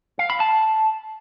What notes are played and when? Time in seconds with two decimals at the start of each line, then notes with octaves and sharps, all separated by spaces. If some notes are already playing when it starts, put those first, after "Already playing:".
0.19 F5
0.30 B5
0.40 A5